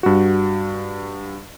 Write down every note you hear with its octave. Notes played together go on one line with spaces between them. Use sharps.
G2 F#4